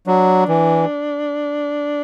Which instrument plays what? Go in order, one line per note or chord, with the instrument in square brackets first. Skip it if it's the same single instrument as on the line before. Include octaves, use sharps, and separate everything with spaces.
[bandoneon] F#3 [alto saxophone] D4
[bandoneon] E3